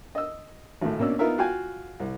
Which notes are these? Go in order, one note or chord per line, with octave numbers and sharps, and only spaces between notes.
D#5 E6
G#1 A2
B2 A#3 C#4 D4 E6
B3 D#4 F4 A#4 E5
F4 F#4 F5 G5 G#5
C2